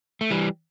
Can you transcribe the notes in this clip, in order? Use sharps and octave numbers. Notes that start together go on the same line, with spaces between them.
A3
E3 G3